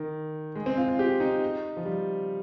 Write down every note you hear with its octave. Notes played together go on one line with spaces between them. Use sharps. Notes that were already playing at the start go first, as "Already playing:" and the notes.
Already playing: D#3
G#3
C4
F4
F4
G4
D#4
F3
G3